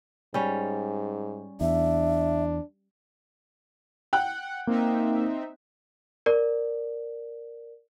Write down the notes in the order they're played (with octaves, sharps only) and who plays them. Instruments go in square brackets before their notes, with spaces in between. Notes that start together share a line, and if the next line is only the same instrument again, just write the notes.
[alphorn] G#2 [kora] G3 C#4
[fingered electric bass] E2 [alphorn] D4 [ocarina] E5
[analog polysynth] F#5 [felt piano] G5 F#6
[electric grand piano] A#3 [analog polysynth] C4 D#4 E5
[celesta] A#4 D5